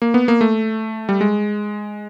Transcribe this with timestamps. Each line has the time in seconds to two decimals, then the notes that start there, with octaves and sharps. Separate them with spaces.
0.02 A#3
0.14 B3
0.28 A#3
0.41 A3
1.09 G3
1.21 G#3